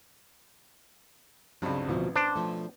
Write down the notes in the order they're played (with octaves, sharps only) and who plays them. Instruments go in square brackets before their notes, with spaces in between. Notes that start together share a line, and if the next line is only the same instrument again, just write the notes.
[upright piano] C#2 G2 [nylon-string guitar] F#3 C4
[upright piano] A1 [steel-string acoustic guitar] D2 B2 F3
[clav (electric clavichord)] D4 [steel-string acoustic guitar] C5
[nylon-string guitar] B2 F3 A3